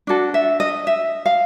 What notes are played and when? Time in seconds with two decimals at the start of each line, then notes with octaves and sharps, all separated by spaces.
0.07 D4 F#4 A4
0.34 E5
0.60 D#5
0.87 E5
1.26 F5